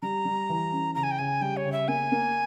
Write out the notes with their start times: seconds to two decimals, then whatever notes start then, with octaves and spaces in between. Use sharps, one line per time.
0.02 G3 A#5
0.25 G3
0.50 E3
0.72 C#4
0.95 C#3 A#5
1.03 G#5
1.11 G5
1.19 C#3 G#5
1.41 G3 G5
1.57 C#5
1.65 C#3
1.72 E5
1.88 A#3 G#5
2.12 A#3